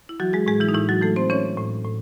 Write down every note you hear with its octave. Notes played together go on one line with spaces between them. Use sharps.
E4
E3 F#3 F#4
G#3 G#4
A2 G#3 G#4
E3 E4
D#4
A2 E3 E4
F#3 F#4
E3 A3 A4
C4 C5
E3 C#4 C#5
A2
A2